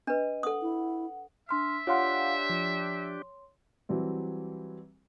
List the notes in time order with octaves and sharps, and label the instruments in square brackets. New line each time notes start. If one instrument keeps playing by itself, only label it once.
[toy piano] D4 B4 [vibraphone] D#5
[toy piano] A4 D#6 [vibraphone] F#5
[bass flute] E4
[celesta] D4 C6 F6 [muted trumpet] E5
[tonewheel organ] D4 G4 [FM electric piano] F4 F5 F#5 [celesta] C#5 C6
[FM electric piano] F3
[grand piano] E3 F#3 G3 C4